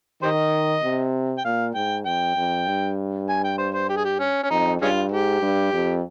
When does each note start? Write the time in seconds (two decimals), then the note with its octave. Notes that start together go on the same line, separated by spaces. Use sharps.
0.22 D#3 G4 C5 D#5
0.83 C3
1.38 G5
1.45 A#2 F5
1.74 G#2 G5
2.06 F2 G5
2.36 F2
2.66 G2
3.29 G#5
3.44 G5
3.58 C5
3.74 C5
3.89 G4
3.97 G#4
4.04 G4
4.19 C#4
4.43 C#4
4.50 F2 D#4
4.81 G2 G#3 C#4 F4
5.11 G#2 G4
5.42 G2
5.73 F2